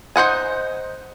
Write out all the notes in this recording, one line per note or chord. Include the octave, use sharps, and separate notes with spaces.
D#4 C5 F#5 G#5